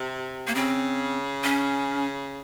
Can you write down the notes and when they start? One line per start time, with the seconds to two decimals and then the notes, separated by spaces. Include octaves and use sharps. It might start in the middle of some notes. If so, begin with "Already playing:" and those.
Already playing: C3
0.47 A#3
0.55 C#3 C4
1.44 C#4